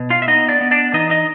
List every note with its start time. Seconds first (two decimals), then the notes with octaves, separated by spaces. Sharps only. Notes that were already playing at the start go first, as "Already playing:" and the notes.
Already playing: B2
0.10 F4 F5
0.22 E5
0.27 B3 D#4 D#5
0.49 D4 D5
0.61 B3
0.71 D4 D5
0.93 E3 D#4 D#5
1.10 D#4 D#5